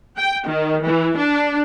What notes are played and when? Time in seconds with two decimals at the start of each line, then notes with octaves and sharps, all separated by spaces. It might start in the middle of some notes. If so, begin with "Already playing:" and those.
0.17 G5
0.46 D#3
0.85 E3
1.18 D4